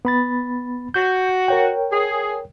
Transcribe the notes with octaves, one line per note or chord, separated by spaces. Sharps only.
B3 B5 A6
F#4 G6
A#4 C#5 G5
G#4